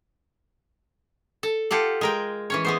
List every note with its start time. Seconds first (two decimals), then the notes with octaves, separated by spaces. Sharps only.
1.43 A4
1.71 F4 G4 A4 F#5
2.01 G#3 A#4 G5
2.50 E3 C#4 C#5
2.65 G#3 B3 C5